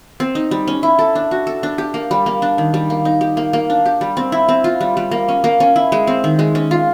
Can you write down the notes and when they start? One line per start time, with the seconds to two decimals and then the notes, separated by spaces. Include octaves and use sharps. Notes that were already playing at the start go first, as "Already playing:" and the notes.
0.20 C4
0.35 D#4
0.51 G3
0.68 C#4
0.83 E4
0.99 A4
1.15 D4
1.31 F#4
1.47 A4
1.63 D4
1.78 G4
1.94 A#3
2.11 G3
2.26 A#3
2.42 D4
2.58 D#3
2.74 G3
2.90 A#3
3.05 D#4
3.21 G4
3.37 A#3
3.53 A#3
3.70 D4
3.86 G4
4.01 G3
4.17 C4
4.32 E4
4.49 C4
4.64 F4
4.81 G3
4.97 G3
5.11 A#3
5.28 C#4
5.44 A#3
5.60 C#4
5.76 E4
5.92 G#3
6.07 C4
6.24 D#3
6.39 G#3
6.55 C#4
6.71 F4